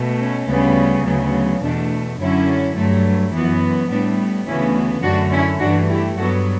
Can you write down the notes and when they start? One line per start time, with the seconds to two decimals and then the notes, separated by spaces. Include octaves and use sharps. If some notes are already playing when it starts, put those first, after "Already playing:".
Already playing: B2 A3
0.20 C#4
0.48 D2 C#3 G3 B3
1.05 D2 C#3 F#3 B3
1.62 E2 B2 A3 D4
2.19 F#2 D3 F#3 C#4 E4
2.76 G2 F#3 A3
3.33 F#2 E3 B3
3.89 A2 G3 B3 D4
4.46 D2 C#3 E3 B3 C#4 E4
5.03 F#2 D3 A3 D4 F#4
5.32 C#4 E4
5.60 G2 E3 A3 D4 F#4
5.89 E4 G4
6.17 G2 F#3 B3 F#4 A4